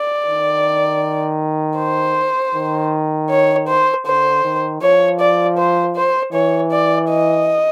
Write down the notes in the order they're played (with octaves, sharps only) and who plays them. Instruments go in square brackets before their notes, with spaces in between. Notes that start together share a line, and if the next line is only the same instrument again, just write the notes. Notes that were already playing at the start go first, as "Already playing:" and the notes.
Already playing: [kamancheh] D5
[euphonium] D#3
[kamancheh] C5
[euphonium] D#3
[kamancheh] C#5
C5
[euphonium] D3 [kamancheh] C5
[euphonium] D#3
[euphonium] F3 [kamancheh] C#5
[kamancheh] D5
C5
C5
[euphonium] E3 [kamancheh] C#5
[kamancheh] D5
D#5